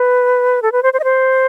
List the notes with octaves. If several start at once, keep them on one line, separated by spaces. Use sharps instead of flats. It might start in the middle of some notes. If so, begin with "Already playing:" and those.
Already playing: B4
A4
B4
C5
C5
D#5
C5